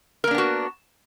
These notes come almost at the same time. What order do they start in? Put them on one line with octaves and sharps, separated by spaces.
A#4 A#3 D4 B3 F#4